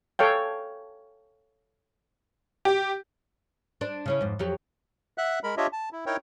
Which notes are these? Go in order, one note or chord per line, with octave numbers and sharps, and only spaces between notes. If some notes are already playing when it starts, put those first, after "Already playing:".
A4 C#5 F5 G5
G4
D4 C5
C#3 C#4 E4
F2 G#2
F2 F#3 G4
E5 F#5 F#6
G#3 A#4 B5
D4 F4 G4 C#5 D#5 E5
A5
E4
D#4 E4 A#4 C#5 G5